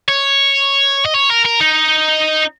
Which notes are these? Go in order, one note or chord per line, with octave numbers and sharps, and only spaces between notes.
C#5
D#5
C#5
A#4
A#4
D#4